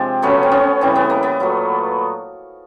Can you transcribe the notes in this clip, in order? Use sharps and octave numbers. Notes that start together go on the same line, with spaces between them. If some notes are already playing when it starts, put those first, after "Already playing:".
Already playing: C3 F3 G#3 C4 D4
C#3 F#3 A3 B3 C#4
C4
B3 C#4
C#3 E3 G3 C4
B3
A#3
B3
A#2 F#3 A3